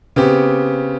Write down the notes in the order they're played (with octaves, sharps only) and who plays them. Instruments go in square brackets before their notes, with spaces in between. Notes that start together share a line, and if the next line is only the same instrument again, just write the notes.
[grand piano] C#3 B3 C4 G4